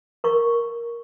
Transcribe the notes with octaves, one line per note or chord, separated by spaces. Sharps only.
A#4 C#6